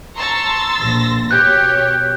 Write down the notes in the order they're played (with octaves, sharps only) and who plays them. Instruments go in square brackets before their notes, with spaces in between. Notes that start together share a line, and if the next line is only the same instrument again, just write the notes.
[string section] A5 A#5 C#6 [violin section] C6 E6 A6
[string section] A#1 A#6
[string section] B2 [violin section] G4 C#5 [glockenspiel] F#6 G6